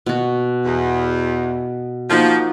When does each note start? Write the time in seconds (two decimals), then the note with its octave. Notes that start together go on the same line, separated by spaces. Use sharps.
0.06 B2 F#4
0.65 E2
2.10 F3 A#3 D#4 F#4